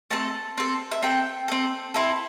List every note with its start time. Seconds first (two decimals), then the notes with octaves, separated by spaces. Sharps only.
0.11 A3 C4 A4 A5
0.58 C4 A4
0.91 E5
1.02 C4 A4 G5
1.48 C4 A4
1.94 C4 E4 A4